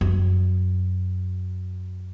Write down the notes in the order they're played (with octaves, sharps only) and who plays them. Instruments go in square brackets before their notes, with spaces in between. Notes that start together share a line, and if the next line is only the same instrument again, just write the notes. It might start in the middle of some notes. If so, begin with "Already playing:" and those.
[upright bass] F#2